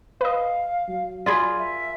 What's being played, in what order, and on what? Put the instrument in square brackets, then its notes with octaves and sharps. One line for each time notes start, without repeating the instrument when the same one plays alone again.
[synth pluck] B4 D#5 [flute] F5
[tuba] F#3
[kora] F4 G#4 A#4 [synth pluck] D5 G#5 B5
[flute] E5